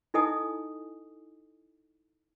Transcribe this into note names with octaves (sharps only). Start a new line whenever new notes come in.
D#4 E4 A4 D#5 G#5 D#6